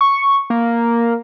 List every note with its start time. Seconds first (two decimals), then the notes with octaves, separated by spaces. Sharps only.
0.01 C#6
0.50 A#3